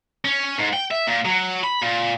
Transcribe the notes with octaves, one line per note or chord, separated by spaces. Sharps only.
C#4
G#2
G5
E5
A#2
F#3
B5
A#2